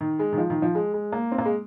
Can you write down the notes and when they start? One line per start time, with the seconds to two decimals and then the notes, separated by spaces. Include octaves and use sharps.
0.01 D#3
0.19 G#3
0.33 D#3
0.38 F3
0.50 D#3
0.62 F3
0.75 G#3
0.94 G#3
1.12 A#3
1.32 C4
1.38 A#3
1.45 G#3